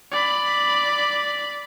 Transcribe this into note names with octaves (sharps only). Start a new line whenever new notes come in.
D5 B5